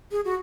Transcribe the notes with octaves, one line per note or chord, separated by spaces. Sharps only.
G#4
F#4